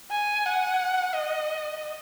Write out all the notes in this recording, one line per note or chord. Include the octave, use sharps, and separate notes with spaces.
G#5
F#5
D#5